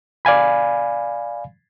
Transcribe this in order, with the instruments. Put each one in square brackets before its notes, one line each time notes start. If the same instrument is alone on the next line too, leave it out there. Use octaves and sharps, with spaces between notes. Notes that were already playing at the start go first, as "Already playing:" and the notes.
[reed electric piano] D5 F5 G#5 B5